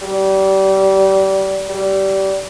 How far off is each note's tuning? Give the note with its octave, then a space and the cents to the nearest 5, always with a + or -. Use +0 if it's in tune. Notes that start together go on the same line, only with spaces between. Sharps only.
G3 -25
G3 -20